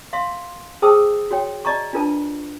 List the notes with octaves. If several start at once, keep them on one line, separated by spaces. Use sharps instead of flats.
E5 F5 C6
G#4 C5 G5 A5 D#6 E6
F#4 C#5 G5
D5 D#5 A5 A#5 C#6
D4 F4 A#4 B4 A5